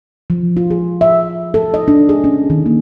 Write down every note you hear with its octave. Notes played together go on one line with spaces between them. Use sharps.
F3
F4
G#4
E5
A4
D#5
D4
G#4
C#4
D#3
A#3